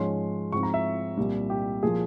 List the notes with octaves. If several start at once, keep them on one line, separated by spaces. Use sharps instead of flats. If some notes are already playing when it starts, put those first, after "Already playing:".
Already playing: G#2 F3 G#3 C#4 C6
G#2 F3 C4 C#6
A#5
E5
C2 A#2 G3
G4
A#2 F3 G#4